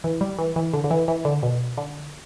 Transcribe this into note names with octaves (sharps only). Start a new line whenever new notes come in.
E3
G3
E3
E3
D3
D3
E3
E3
D3
B2
D3